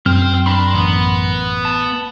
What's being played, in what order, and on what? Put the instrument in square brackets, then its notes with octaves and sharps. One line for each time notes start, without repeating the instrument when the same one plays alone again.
[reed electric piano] F#2 [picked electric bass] C4 [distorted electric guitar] C5 G5 [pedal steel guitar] F6
[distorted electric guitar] D4 [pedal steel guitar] A#4 B5 C6
[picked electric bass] A1 [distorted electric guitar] B3
[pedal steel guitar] A5